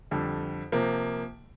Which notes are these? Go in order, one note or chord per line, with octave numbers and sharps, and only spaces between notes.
F2 D3 G3
C3 F3 A#3